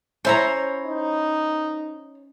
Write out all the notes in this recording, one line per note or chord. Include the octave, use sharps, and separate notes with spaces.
C#4 E4 C5 C#5 A#5
D#4